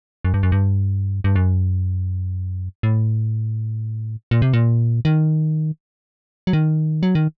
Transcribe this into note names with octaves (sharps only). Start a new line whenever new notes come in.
F#2
G2
F#2
G2
G2
F#2
A2
A#2
C3
A#2
D#3
F#3
D#3
F#3
D#3